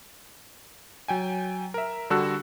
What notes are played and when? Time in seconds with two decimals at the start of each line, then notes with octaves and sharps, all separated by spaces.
1.08 F#3 G5 G#5
1.74 A#4 E5
2.10 D3 G3 F#4 A4 E6 F#6